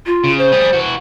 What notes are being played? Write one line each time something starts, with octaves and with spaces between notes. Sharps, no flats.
F4
C#3
C5
G3 G#4
E3 F#4